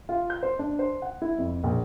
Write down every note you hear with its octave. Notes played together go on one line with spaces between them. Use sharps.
F4
G6
C5
D4
C5
F#5
E4
F2
A#1